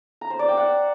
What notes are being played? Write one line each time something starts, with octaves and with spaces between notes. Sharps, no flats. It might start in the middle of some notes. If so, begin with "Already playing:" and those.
A#5
C5
D5
G5
F#5